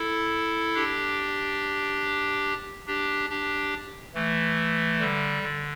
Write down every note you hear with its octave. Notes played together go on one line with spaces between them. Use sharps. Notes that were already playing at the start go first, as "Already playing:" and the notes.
Already playing: E4 A4
D4 G4
D4 G4
D4 G4
E3 A3
D3 G3
D3